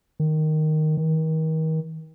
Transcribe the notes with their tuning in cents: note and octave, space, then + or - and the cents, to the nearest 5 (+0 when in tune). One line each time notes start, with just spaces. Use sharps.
D#3 -5
D#3 +35